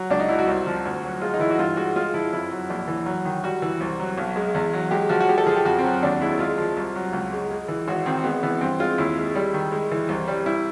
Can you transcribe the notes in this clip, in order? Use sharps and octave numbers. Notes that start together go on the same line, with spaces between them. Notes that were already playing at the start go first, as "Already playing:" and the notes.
Already playing: F#3
C#2 D4
D#4
F#3 E4
F#4
C2
F3
D2
F#3
G#3 F4
D#4
E3 E4
F#4
G2 F4
G#3 F#4
G#3 F4
F3 E4
F2 E4
F#3
A#1
E3
F#3
D#3
G3 F#4
E3
C2
F#3
B1
G#3
E2
F#3
G#3 G4
F3 F#4
F#4
G#3 G4
A4
F3 G#4
G4
F2 F#4
C4
F#3
D#2 D4
G#3 E4
G#3 F4
F3
C2
F#3
C#2
G#3
G#3
E3
G#1 F#4
D#3 C4
G#3 B3
E3 B3
G2 C4
G#3 F4
D#2 E4
G#3
G3
D#3
G#3
E3
C2
G3
G3 E4